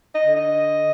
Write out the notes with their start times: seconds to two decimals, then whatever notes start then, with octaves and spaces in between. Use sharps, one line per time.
0.13 D#5
0.24 D3
0.34 D#5